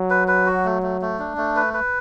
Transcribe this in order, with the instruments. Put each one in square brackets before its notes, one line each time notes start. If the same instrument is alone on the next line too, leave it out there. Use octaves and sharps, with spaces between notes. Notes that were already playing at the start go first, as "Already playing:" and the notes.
Already playing: [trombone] F#3
[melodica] B4
B4
F#4
A3
A3
A3
D4
A3
B4
B4